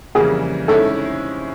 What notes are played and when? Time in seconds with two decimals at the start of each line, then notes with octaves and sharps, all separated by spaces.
0.15 F2 C#3 E3 G3 A#3 G#4
0.68 C3 D#3 G#3 C#4 E4 A4